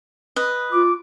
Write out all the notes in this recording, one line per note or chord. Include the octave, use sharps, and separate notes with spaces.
B4 D#5
F4 D6